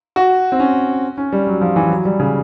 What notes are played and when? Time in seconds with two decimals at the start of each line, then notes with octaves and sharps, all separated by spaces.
0.16 F#4
0.52 C4
0.60 C#4
1.18 C#4
1.33 G3
1.47 F#3
1.61 F3
1.76 E3
1.90 F#3
2.05 G3
2.20 C#3